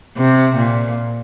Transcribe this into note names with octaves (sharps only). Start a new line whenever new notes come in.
C3
A#2